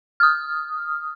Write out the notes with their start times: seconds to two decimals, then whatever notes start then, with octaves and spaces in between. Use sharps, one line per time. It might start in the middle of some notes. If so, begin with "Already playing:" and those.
0.20 D#6 F6